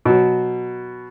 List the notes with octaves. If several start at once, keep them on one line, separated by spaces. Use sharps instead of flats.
B2 F#3